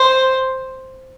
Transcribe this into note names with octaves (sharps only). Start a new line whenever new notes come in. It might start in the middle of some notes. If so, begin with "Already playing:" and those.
Already playing: C5